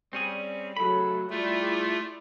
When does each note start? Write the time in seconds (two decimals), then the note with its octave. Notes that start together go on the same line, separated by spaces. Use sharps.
0.13 G3 C4 C#4 G#4
0.77 C#3 F#3 A3 A4 B5
1.30 G3 A3 E4 F4 G#4 D5